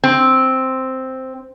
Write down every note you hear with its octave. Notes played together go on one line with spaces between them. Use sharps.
C4